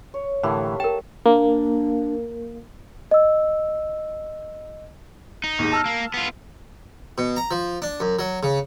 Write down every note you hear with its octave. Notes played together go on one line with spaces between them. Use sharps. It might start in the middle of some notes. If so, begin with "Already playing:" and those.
C#5
A2 D3 E3 A3 A#3 G4
A#4 G5 A5
A#3 D4
D#5 E6
D#4
D#2 G#2
A5 E6 F6
A#3
B3 F4
B2
A#5
F3
D4
F#2
F#3
C#3